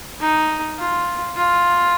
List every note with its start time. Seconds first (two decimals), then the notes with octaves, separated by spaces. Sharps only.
0.21 D#4
0.78 F4
1.37 F4